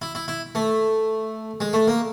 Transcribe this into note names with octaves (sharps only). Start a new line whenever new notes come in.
E4
E4
E4
A3
G#3
A3
A#3